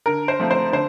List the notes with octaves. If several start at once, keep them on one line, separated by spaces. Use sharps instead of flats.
D3 A#4
C5
F3 A3 C4
C5
D3 C5